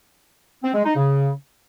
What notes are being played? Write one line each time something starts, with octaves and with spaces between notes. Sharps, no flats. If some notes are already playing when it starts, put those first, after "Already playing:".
C4
G#3
D#4
C#3